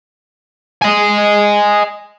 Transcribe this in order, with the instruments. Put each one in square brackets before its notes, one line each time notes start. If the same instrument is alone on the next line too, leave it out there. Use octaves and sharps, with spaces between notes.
[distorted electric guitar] D#5 G#5